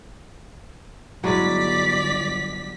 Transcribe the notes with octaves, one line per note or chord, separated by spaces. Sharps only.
G1 F#3 G#3 E4 D5 B6